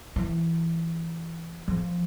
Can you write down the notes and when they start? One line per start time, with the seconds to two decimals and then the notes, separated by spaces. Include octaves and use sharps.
0.16 E3
1.68 F3